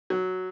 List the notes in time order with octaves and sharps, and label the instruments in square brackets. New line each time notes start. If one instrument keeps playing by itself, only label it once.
[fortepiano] F#3